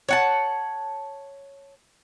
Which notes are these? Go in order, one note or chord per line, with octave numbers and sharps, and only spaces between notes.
C#5 F#5 A5